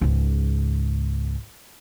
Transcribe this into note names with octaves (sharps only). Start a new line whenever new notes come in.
C#2 G#2